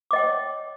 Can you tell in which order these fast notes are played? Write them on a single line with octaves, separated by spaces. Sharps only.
D6 D#5 G5 C#5